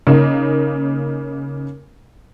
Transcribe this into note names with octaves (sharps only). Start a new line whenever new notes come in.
C#3 A#3 D#4